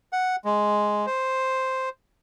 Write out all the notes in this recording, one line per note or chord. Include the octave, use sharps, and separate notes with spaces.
F#5
G#3
C5